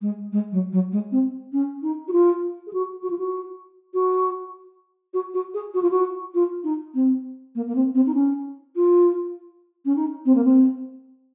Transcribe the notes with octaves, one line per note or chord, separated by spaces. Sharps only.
G#3
G#3
F#3
F#3
G#3
C4
C#4
D#4
F#4
F4
G#4
F#4
F#4
F4
F#4
F#4
F#4
F#4
G#4
F#4
F4
F#4
F4
D#4
C4
A#3
A#3
C4
C4
D#4
C#4
F4
C#4
D#4
C4
A#3
C4